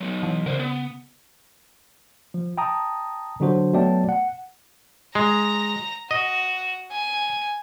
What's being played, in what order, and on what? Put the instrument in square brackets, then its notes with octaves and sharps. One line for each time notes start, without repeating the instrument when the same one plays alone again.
[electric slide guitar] F#3 B3
[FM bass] E3
[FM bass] C#3 [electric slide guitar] A#4 C5 D5
[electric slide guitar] B3
[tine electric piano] F3
G5 A5 A#5 D#6
D3 F#3 D4 F#4 C5
F#3 A3 B3 D5 G5 A5
F#5
[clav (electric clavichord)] G#3 [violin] A#5 A#6
[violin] F#4 [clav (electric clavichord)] D#5
[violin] G#5